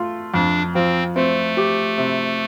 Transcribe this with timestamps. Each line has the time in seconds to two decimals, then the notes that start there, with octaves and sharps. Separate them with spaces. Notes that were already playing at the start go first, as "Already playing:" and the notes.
Already playing: A3 F4
0.34 F2 D4
0.74 F3 C4
1.16 A3 C4
1.57 G4
1.98 C3